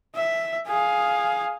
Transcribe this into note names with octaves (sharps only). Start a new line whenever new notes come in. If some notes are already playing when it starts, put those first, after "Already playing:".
E5
G#4 F5